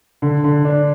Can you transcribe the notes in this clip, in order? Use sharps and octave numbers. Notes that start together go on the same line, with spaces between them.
D3
D3
D4